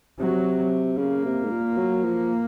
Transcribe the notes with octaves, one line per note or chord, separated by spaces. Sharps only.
C3 F#3
C#3 A#3
C3
G#2
A#2
F#3
F3